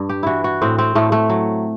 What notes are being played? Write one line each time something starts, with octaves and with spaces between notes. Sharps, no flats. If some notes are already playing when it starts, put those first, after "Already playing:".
Already playing: G2 D4
G4
E3 E4 F#4
F#4
A2 C4
C4
A2 A3
A3
F#3